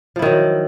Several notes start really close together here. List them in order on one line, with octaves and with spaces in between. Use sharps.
F3 E4 D#3 F#3